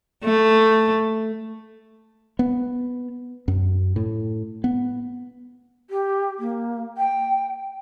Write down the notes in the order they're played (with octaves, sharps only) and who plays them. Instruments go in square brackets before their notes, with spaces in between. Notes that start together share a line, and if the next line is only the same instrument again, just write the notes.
[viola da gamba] A3
[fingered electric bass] B3
F#2
A2
B3
[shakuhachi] G4
A#3
G5